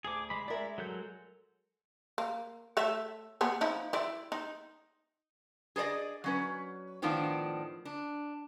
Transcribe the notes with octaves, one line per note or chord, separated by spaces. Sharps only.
D2 G#4 D6
G#3 B5
G#3 A#4 D5 E5
F#3 A4 G6
A#3
A3 C#5 E5
A#3 B3 G#4
F3 D#4 E4
E4 D5
D#4
G#4 A4 C5 D5 D#5
F#3 C#4 B4
A2 D#3 F3 B3 D4
D4